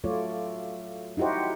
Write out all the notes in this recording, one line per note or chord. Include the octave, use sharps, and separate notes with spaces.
F#3 A3 F4 C#5 D5
D#4 E4 F#4 G4 C5